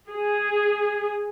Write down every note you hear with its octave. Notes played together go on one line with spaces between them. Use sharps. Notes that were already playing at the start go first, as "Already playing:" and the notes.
G#4